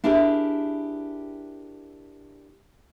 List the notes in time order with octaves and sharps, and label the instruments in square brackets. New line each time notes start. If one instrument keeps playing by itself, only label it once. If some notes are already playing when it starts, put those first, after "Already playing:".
[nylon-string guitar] D4 E4 G4 G#4 A#4 E5